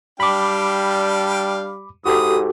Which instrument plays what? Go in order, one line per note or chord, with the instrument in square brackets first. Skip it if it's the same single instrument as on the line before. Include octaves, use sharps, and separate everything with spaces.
[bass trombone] G3 [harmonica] D4 F5 G5 [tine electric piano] B5 D6
[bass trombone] G#2 [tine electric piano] F#4 G4 A4 [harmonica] B5 D#6